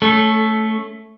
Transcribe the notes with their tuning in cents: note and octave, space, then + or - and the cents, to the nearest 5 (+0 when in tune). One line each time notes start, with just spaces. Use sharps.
A3 +0 C#4 +0 A4 -20